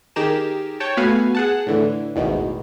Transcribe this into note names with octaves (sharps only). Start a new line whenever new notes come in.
D#3 G4 G#4 A#4 E7
C#5 G5 A5
A3 B3 F#4 B4 F5 G#5
G#4 F#5 A5
A2 D3 E3
A1 E2 G#2 B2 D#3